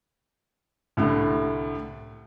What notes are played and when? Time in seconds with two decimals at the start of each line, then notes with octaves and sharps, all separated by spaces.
0.97 C2 A2 D3 A3